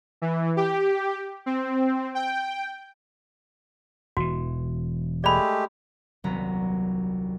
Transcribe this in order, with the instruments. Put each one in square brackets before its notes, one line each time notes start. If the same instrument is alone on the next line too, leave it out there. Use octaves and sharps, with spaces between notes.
[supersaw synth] E3
G4
C4
G5
[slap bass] E1 E3 [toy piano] F#4
[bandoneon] G#3 A3 G4 [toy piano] D5 B5
[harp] D#1 C2 F#3 B3 A#5 B5